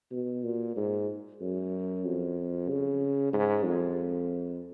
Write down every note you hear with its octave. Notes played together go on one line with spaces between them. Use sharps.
B2
A#2
G#2
F#2
F2
C#3
G#2
F2